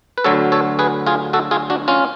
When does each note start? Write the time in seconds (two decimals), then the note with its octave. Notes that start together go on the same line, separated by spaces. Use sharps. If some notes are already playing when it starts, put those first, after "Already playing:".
0.18 B4
0.24 D2 D3 F#3 A4 C#5
0.52 A4 C#5
0.79 G#4 B4
1.07 F4 G#4
1.33 F#4 A4
1.51 F4 G#4
1.70 D4 F#4
1.88 C#4 F4